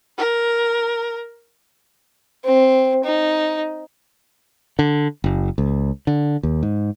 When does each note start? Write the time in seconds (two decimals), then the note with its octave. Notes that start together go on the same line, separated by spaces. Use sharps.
0.18 A#4
2.45 C4
3.04 D#4
4.79 D3
5.24 F#1
5.58 C#2
6.07 D3
6.43 D#2
6.63 G#2